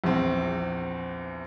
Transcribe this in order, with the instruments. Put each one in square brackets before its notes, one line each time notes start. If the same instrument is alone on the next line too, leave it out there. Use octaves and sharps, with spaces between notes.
[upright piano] A#1 E2 C4